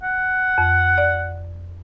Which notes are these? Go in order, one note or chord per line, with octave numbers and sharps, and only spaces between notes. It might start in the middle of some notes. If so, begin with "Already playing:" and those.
F#5
F2
D5